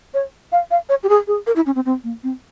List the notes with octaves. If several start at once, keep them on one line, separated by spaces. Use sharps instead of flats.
C#5
F5
F5
C#5
G4
G#4
G#4
A#4
E4
C#4
C4
C4
A#3
C4